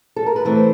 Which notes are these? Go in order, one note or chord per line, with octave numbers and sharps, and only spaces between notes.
A4
A#4
B4
E3 A3 C4 C5